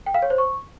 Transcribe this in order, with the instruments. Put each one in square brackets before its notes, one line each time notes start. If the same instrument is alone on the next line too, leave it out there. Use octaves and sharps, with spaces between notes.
[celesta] G5
F5
C#5
C5
C#6